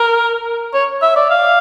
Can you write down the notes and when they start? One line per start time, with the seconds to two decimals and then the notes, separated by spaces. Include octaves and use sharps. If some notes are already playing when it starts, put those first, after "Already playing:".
Already playing: A#4
0.74 C#5
1.02 E5
1.16 D5
1.30 F5